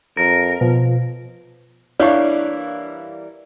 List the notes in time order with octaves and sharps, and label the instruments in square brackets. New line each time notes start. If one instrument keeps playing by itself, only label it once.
[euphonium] F2 [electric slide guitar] A#4
[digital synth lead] B2 [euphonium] F3
[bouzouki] E3 G3 A#3 [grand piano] D4 [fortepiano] E4 F5 C#6 [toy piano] C#5